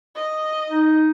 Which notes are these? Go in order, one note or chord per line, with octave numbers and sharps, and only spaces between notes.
D#5
D#4